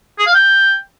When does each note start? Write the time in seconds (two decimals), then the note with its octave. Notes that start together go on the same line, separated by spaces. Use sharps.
0.19 G#4
0.27 F5
0.34 G5